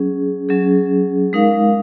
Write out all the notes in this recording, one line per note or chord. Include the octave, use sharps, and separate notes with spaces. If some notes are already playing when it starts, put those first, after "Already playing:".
Already playing: F#3 C#4 G#4
F#3 C#4 G#4
G#3 D#4 A#4 F5